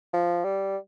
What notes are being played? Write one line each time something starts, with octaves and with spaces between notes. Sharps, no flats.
F3
G3